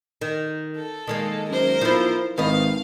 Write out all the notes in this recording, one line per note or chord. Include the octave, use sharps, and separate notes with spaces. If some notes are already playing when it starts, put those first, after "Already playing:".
D#3
A4
D#3 G#3 A#3
F#2 A#4 C5
B1 F3 E4
G#1 D#3 B4 D#5 F5